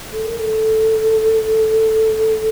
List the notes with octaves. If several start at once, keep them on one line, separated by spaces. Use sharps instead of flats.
A4
A#4
A4